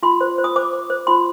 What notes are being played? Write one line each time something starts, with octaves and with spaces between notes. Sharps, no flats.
F4 C6
C5
C5
D#6
C5 D6
C5
C5
F4 C6